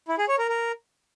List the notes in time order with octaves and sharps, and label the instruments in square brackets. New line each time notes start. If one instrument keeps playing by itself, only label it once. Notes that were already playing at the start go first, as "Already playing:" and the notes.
[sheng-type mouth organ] E4
G#4
C#5
A#4
A#4